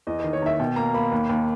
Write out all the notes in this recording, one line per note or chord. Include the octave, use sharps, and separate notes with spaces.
E2 D#5
D#3 D#5
C#5
D#3 E5
B2 G5
A#3 A#5
A#3 B5
D#2
D#2